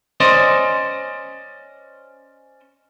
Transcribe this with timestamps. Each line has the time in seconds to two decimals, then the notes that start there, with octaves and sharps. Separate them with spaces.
0.20 C#4 C5 D5 D#5